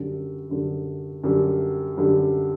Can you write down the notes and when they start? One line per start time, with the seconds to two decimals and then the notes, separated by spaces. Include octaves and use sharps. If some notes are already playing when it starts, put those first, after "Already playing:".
Already playing: F#2 D3 G3
0.49 F#2 D3 G3
1.24 F#2 D3 G3
1.97 F#2 D3 G3